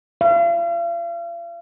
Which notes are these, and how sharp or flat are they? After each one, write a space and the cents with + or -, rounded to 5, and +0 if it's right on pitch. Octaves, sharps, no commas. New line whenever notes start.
F5 -40